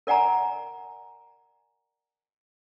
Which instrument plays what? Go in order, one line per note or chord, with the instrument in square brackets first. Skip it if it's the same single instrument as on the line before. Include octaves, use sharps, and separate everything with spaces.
[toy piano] A#4 D5 F#5 G#5 A#5